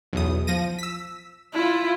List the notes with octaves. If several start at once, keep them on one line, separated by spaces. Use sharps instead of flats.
B1 E2 D#6
F3 A#6 D#7
E6 B6
E4 F4